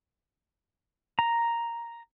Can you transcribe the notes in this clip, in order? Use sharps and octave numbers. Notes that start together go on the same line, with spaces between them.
A#5